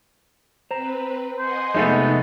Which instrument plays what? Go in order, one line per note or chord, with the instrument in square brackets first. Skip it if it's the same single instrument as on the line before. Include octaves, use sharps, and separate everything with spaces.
[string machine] C4 B4 [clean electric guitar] C5 A#5
[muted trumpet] C5 [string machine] D#5 F#5 G#5
[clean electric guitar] F2 D#4 [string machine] C3 [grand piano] G#3 A3 B3